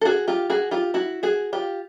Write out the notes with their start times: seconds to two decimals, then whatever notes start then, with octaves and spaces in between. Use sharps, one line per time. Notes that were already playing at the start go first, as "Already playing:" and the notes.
0.01 A4
0.05 F#4 G#4
0.28 F4 G4
0.50 F#4 G#4
0.71 F4 G4
0.94 E4 F#4
1.23 F#4 G#4
1.53 F4 G4